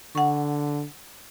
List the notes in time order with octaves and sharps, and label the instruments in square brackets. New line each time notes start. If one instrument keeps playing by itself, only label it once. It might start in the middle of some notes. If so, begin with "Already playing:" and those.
[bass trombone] D3 [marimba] F#5 C#6